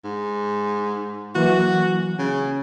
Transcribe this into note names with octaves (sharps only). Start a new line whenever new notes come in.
G#2
E3 F#3 A#3 F#4
C#3